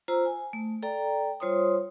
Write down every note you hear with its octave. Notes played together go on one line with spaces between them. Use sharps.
F4 C5 A#5 E6
G#5
A3
A4 D5 G5 A#5
G3 F4 C5 C#5 C6 D#6